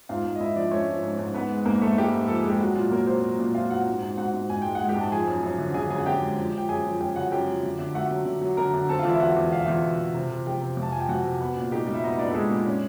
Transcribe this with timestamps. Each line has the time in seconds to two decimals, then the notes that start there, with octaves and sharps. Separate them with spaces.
0.09 G#2 F4 F5
0.25 G#2
0.36 D#5
0.40 G#2 E4 E5
0.55 F3 D4 D5
0.71 A3 C#4 C#5
0.87 F3
1.03 G#2
1.19 G#2
1.34 G#2 B3 B4
1.50 G#3
1.65 G#2 A#3 A#4
1.81 G#2 A3 A4
1.97 G3 G#3 G4
2.14 G#2
2.28 F3 A4
2.39 G#4
2.45 G#3
2.50 G4
2.60 F#3 F#4
2.75 A#2 F4
2.91 F#3 A#3 A#4
3.07 C4 C5
3.23 F#3
3.39 A#2
3.55 C4 F4 F5
3.70 C4 F#4 F#5
3.86 G#2
4.02 G#2
4.17 G#2 F#4 F#5
4.33 G#2
4.50 G#2 G#5
4.62 G#3 G5
4.75 F#5
4.81 G#3
4.89 G4 G5
4.96 G#2
5.01 A5
5.12 F3 G#4 G#5
5.27 F#2
5.43 F#2
5.58 D3
5.74 D3 G#4 G#5
5.90 F#2 G#4 G#5
5.98 F#5
6.06 D3 G4 G5
6.21 G#3
6.37 F3
6.54 F3 G5
6.69 F#2 G#4 G#5
6.85 F3
7.00 F#2 G4 G5
7.16 C#3 F#4 F#5
7.31 F#2 G4 G5
7.48 F3
7.63 D3
7.79 D3
7.94 A3 F#4 F#5
8.11 F#3
8.26 D3
8.42 F#3
8.57 D3 A#4 A#5
8.74 D3
8.89 C4 A4 A5
8.99 F4 F5
9.05 E2 E4 E5
9.20 E2 F#4 F#5
9.37 E2
9.51 B2 F5
9.59 E5
9.66 E2 F4 F5
9.83 B2
9.99 E2
10.14 C3
10.31 C3
10.46 F3 G4 G5
10.61 C3
10.77 F2
10.83 A5
10.92 F3 G#5
11.00 G5
11.09 F2 F#4 F#5
11.24 C3
11.41 B3
11.56 A#2
11.72 D#4 G4 G5
11.87 G3
11.94 E5
12.03 B3 D#4 D#5
12.19 B3 D4 D5
12.31 A4
12.34 G#3 D#4 G#4
12.51 A#2
12.66 C#4